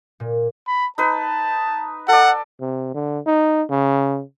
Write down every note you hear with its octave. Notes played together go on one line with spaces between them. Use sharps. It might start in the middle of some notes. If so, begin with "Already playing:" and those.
A#2
B5
D#4 B4 A5
A4 D5 F#5
C3
D3
D#4
C#3